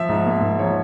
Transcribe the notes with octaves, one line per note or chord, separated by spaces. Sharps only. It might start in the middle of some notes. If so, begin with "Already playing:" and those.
Already playing: F3 E5
G#2
A#3
G#2
F3 C#5